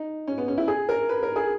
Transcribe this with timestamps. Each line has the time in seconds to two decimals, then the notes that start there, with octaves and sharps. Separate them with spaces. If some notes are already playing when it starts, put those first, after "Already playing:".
Already playing: D#4
0.27 C#4
0.38 B3
0.48 C#4
0.58 E4
0.68 G#4
0.89 A#4
1.09 B4
1.23 A#4
1.36 G#4